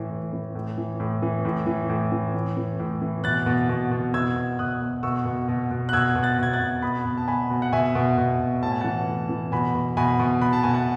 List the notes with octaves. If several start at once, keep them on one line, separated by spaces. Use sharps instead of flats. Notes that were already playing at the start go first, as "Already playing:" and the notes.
Already playing: A2 E3
A2
E3
A2
E3
A2
E3
A2
E3
A2
E3
A2
E3
A2
E3
B2 F#6 A6
B2
B2
B2
B2 E6 G#6
B2
B2 D#6 F#6
B2
B2 C#6 E6
B2
B2
B2
F#6
B2 E6 G#6
B2
F#6 A6
B2 G#6
F#6 A6
B2
B2 B5 D#6
B2
A5
B2 G#5 B5
B2
F#5
B2 E5 G#5
B2
B2
B2
A2 A5
G#5
E3 F#5 A5
A2
E3
B2 G#5 B5
B2
B2 G#5 B5
B2
B2 B5
A5
B2 G#5
F#5 A5